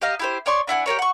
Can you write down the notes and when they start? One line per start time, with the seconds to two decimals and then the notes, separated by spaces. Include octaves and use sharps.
0.02 G4 D#5 F5 A#5
0.19 E4 G4 C5
0.46 C#5 D5 C6 C#6
0.67 D4 E4 F#5 G#5
0.86 G4 G#4 A#4 C#5
0.99 F#5 C#6